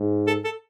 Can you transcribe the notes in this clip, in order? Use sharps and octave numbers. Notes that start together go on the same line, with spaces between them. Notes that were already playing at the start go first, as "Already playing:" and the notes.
Already playing: G#2
A4
A4